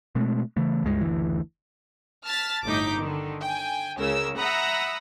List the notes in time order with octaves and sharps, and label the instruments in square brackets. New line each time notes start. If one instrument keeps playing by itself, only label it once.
[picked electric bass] B2 G#3 A3 C4
C#3 E3 A3
C#2 G2 G#3
F#1 D2 E3
[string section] A5 F6 A6 B6
G1 A2 D#4 D6 G6 B6
D3 D#3
G5 G#5
C#2 C#3 A#4 E6
E5 F#5 A#5 B5 D#6 E6